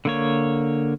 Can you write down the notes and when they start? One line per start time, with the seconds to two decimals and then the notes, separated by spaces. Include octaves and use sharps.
0.05 D3 A#3 C#5